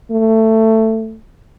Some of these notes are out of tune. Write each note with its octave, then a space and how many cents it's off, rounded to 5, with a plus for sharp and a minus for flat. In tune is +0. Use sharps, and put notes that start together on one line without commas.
A3 +15